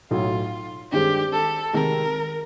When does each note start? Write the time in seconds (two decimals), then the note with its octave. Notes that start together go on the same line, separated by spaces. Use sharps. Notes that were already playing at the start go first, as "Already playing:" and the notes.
0.11 B1 A2 F#3 F4
0.92 G2 D#3 G#3 C4 G4
1.33 A4
1.73 C3 D#3 G#3 A#4